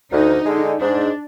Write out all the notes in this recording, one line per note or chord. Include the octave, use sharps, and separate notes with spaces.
D2 D#4
D3 G#3
G#2 D4